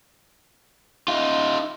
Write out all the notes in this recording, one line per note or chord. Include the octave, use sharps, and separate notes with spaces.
D#4 F4